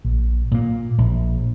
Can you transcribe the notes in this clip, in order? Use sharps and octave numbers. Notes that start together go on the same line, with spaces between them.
A#1
A#2 A#3
A#1